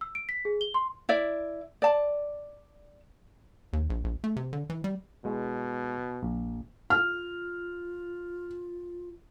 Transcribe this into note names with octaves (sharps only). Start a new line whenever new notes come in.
E6
D7
B6
G#4
G7
C6
E4 D5 E5
D5 A5
D#2
A#1
A#1
A3
C3
D3
E3
G3
B2 G#3 E4
A#1
F4 F6